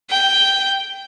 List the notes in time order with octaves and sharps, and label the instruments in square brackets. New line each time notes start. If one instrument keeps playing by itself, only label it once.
[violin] G5